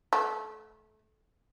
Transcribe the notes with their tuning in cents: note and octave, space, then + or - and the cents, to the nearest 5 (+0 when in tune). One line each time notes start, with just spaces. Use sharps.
A3 -25